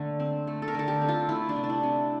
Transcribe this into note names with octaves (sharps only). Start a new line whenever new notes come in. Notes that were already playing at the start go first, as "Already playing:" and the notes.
Already playing: D3 A3 A#3
C4
A3
A4
A#4
D3 A4
G4
C4
F4
A3 E4
D4
C3
D4
E4
C3